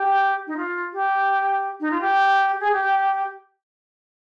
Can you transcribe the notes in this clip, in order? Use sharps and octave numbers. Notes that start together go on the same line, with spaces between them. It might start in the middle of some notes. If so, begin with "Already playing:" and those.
Already playing: G4
D#4
F4
G4
D#4
F4
G4
G#4
G4